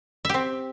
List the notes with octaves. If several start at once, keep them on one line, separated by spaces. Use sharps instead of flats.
C4 G4 E5